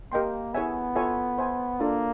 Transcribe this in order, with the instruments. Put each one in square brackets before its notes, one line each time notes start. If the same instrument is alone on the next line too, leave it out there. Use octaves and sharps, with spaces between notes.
[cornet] A#3 [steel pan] G4 A#4 D#5 G5 C6
[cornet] B3 [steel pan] E4 G#4 C#5 E5 G#5
[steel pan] F4 A4 C#5 E5 G#5
C5 E5 G#5
[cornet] A#3 [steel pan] D4 F4 A4 D5